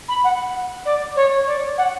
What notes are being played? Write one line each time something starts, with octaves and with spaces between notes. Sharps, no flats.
B5
F#5
D5
C#5
D5
F#5